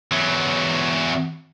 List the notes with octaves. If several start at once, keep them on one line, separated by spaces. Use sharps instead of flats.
E2 F#3